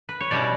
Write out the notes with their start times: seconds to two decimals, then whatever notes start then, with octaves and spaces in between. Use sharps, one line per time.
0.09 B4
0.20 C#5
0.31 B2 G3 C#4 E4 D5